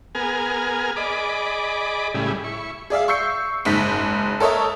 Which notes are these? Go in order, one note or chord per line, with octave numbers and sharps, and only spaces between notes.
B3 G#4 A#4 G#5 F6
G#4 D5 D#5 B5 D6
A2 C#3 G3 E4 G#4
E4 C#6
G#4 D5 E5 F5
C#6 E6 G6 C7 C#7
F#1 G#2 B6
A4 A#4 C#5 D#5 E5